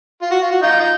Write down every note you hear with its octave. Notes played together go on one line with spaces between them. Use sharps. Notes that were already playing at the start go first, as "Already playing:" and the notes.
F4
F#4
F4
F#4
D#4 F4
D#4